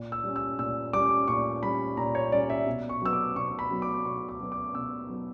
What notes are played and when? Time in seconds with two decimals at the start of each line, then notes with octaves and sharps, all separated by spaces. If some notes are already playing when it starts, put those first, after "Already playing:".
Already playing: A#2
0.12 E6
0.24 G3 C#4
0.36 E6
0.59 A#2 E6
0.93 G3 C#4 D6
1.28 A#2 C#6
1.63 G3 C#4 B5
1.97 A#2 A#5
2.15 C#5
2.32 G3 C#4 D5
2.50 E5
2.66 B2
2.89 C#6
3.02 F#3 B3 E6
3.13 D6
3.36 B2 C#6
3.59 B5
3.71 F#3 B3
3.82 D6
4.05 B2 C#6
4.29 D6
4.40 F#3 B3
4.52 D6
4.75 B2 E6
5.09 F#3 B3